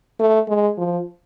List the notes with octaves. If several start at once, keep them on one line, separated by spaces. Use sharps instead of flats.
A3
G#3
F3